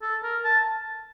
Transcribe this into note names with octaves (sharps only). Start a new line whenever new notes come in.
A4
A#4
A5